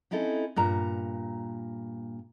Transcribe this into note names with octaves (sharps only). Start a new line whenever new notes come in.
C4 C#4 D#4 E4 A4
G2 A#2 A#5